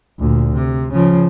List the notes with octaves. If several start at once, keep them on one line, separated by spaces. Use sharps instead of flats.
D2 A#2
C3
C#3 F3